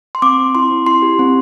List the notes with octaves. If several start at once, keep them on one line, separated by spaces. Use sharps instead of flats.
C6
C4 D6
C4
E4 C6
C4
E4 C6
G4
C4